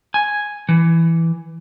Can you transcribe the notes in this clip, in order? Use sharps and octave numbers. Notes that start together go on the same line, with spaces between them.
G#5
E3